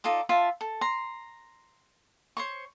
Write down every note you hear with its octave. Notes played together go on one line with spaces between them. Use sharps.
D#4 F4 A4 D5
F4 E5 A5
A4
A#5 C6
C5 C#5 C#6